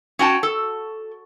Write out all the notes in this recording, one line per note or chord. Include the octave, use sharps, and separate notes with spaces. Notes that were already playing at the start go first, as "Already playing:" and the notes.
C#4 F#4 G5 A5
A4